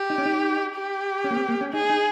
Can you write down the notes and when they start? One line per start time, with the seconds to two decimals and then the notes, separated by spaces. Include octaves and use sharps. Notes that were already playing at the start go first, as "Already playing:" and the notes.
Already playing: G4
0.10 D#4
0.18 C#4
0.26 D#4
0.75 G4
1.24 C#4
1.31 A#3
1.37 C4
1.49 A#3
1.61 C#4
1.73 D#4 G#4
1.90 D#4